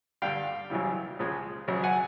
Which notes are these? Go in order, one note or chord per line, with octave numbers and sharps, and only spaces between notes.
G2 D3 G3 F5 G5
G#1 F#2 C#3 E3 G3
C#2 C#3 F3 G#3
G#1 F#2 C#3 F#3
F#5 G#5